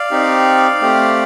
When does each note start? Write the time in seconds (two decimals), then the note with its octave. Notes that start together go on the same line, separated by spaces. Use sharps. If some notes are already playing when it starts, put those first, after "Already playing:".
Already playing: D5 F5
0.11 C4 D#4 G4
0.81 A3 C4 G4